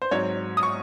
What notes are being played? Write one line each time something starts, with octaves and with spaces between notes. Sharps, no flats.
C5
G#2 F#3 C4 C#5
D#6
C#6